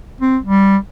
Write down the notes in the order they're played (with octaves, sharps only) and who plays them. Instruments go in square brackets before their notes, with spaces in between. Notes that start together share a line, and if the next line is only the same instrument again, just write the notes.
[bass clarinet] C4
G3